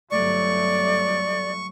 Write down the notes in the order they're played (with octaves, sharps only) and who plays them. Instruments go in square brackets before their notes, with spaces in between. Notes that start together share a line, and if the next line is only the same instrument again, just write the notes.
[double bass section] G1 F#3 A3 [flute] D5 [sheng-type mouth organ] C#6